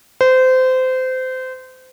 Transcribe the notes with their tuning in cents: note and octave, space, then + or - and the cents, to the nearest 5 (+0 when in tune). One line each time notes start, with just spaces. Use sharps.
C5 -25